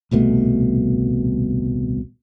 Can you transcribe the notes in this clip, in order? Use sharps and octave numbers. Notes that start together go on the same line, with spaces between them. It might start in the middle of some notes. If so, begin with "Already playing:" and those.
D#1 C2 B2 A3